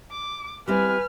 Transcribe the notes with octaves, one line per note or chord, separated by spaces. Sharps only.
D6
G3 C4 E4 B4 G#5 F6